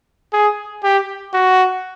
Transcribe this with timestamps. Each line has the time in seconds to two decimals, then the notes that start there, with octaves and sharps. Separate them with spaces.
0.33 G#4
0.83 G4
1.33 F#4